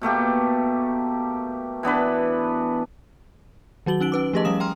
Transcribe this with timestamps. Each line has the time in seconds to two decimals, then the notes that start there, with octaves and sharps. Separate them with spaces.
0.02 B2 A3 A#3 G4
1.83 E3 B3 D4 B4
3.86 D#3 F#3 F#4 F#7 G7
4.00 C#4 D#4 D7
4.12 C#4 B4 D6
4.33 F3 A3 G4 G#4 D#5 A5
4.45 F3 G3 C#4 F5 D#6 E7
4.60 G5 A#5 C6 F6